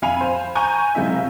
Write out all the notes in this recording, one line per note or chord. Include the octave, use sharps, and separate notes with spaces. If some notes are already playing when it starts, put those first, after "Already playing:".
F2 F5 G#5 B5 F7
C5
G#5 A#5 C#6 G6
F#1 C3 G#3 F4 E5